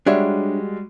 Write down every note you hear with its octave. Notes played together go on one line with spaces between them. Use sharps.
G3 G#3 D4 F#4 C#5 E5